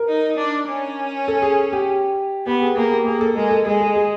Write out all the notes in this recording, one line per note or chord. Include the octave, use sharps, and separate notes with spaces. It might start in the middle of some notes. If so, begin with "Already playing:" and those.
Already playing: A#4
D#4
D4
C#4
A4
G#4
G4
B3 G4
G#4
A#3 G#4
G4
A#3 G#4
A4
G#3 A#4
A4
G#3 G#4
G#4
G#4